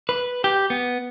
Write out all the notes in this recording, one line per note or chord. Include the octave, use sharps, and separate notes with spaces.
B4
G4
B3